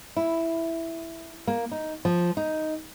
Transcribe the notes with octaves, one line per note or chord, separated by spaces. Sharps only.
E4
A#3
D#4
F3
D#4